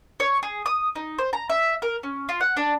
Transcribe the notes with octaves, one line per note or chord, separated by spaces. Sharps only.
C#5
G#4
D#6
D#4
C5
A#5
E5
A#4
C#4
F4
F#5
D4